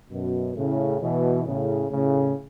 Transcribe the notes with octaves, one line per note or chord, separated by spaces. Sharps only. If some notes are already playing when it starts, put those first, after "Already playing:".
F#2 B2
A2 C#3
B2 E3
A2 C#3
A2 C#3